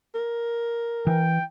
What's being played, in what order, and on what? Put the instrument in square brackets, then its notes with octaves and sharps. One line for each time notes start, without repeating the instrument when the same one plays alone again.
[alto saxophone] A#4
[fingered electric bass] E3 [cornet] G5